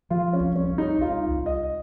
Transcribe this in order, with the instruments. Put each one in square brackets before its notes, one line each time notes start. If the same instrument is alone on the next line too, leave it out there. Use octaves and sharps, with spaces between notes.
[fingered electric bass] F3 [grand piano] F4
[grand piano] C#4
[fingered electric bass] C2
[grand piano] C#4
[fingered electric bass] C2
[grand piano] D#4
[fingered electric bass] C2 [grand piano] F4
[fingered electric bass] C2
[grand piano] D#5